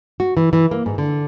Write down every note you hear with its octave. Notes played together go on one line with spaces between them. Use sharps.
F#4
E3
E3
A#3
G#2
D3